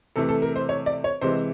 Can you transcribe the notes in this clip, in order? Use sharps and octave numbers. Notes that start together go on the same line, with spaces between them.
C3 E3 A3 A4
A4
A#4
C5
C#5
D5
C#5
C3 E3 G#3 C5